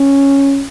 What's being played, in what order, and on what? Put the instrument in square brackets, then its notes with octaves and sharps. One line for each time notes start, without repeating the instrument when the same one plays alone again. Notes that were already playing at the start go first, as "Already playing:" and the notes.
Already playing: [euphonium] C#4